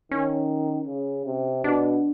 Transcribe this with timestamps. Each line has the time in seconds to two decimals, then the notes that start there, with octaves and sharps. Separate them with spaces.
0.11 D#3 C#4
0.87 C#3
1.25 C3
1.64 B2 D4